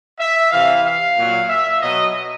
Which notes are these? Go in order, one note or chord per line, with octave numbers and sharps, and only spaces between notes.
E5
C3 E3 F5
F5
A#2 F#3
E5
B2 F#3 D#5